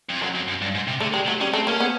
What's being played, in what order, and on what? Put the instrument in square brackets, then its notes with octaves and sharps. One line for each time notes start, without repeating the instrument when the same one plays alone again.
[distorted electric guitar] F2
[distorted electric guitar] F#2 [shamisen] F#3
[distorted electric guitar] F2
F#2
G2
G#2
C3
[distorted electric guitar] D3 [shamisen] A3
[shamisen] G3 [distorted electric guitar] G#3
[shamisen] F#3 [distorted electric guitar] A3
[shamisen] G3 [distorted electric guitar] C#4
[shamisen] A3 [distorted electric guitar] C4
[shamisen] A#3 [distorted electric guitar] C#4
[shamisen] B3